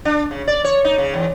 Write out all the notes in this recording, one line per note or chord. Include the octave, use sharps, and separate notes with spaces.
D4
C#3
D5
C#5
D#4
C#3
E2